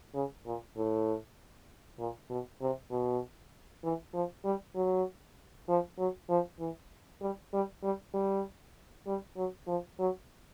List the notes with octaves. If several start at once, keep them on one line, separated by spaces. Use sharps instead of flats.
C#3
A#2
A2
A#2
B2
C3
B2
E3
F3
G3
F#3
F3
F#3
F3
E3
G3
G3
G3
G3
G3
F#3
F3
F#3